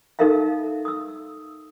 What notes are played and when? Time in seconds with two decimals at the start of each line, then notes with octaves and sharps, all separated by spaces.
0.19 D#4 A4 A#4 E5 F5
0.85 D#6 E6